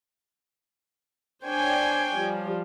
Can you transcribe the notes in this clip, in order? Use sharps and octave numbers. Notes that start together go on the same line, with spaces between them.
D4 C5 C#5 G5 G#5
F3 G3